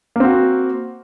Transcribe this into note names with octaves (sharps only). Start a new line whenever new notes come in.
A#3 C4 F#4